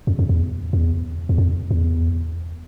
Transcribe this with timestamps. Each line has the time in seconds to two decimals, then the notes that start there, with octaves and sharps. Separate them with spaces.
0.07 F2
0.19 F2
0.29 E2
0.73 E2
1.29 E2
1.38 F2
1.71 E2